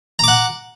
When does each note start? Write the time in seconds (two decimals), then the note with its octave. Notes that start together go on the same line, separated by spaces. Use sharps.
0.19 A#5
0.24 D6
0.28 F#5